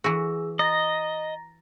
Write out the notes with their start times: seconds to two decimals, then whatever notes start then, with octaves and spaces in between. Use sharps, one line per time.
0.04 E3 F#4 G#4 E6
0.59 D#5 A#5 A6 A#6